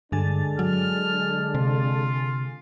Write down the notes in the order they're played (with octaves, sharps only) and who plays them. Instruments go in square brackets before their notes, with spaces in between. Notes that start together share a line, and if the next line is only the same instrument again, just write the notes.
[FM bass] G2 [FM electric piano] D3 G#5 A6 [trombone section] G#3 D4 A4
[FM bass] F#3 [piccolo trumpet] F6
[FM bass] C3 [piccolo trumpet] F4